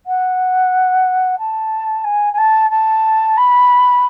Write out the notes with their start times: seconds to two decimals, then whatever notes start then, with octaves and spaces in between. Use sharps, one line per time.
0.06 F#5
1.39 A5
2.04 G#5
2.33 G#5
2.38 A5
2.70 A5
3.37 B5